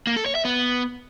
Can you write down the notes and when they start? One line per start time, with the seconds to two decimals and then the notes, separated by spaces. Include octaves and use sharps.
0.07 A#3
0.16 A4
0.26 C#5
0.35 E5
0.45 B3